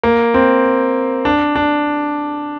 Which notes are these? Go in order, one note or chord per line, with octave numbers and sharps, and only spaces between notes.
A#3
C4
D4
D4